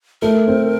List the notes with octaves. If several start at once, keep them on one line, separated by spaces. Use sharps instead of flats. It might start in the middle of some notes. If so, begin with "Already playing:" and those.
A3 A#4
C4